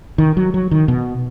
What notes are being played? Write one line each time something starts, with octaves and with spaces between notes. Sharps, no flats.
D#3
F#3
F#3
D#3
B2